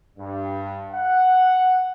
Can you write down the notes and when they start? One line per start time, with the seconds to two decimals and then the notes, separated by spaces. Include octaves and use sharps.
0.18 G2
0.93 F#5